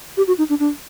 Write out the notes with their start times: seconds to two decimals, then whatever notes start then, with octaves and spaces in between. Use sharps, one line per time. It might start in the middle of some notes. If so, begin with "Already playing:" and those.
0.17 G4
0.27 F#4
0.38 D#4
0.49 D4
0.60 D4